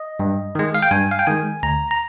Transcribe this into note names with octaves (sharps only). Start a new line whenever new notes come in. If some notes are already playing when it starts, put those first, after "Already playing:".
Already playing: D#5
G2
D#3 G#3
F5
G5
G2 G#5
F5
G5
D#3 G#3 G#5
D2 A#5
A#5